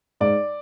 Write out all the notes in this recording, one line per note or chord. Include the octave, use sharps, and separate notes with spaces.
G#2 D5